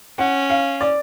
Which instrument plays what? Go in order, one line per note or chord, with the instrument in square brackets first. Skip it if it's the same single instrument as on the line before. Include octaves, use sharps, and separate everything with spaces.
[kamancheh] C#4 [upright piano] F#5
[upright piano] F5
D5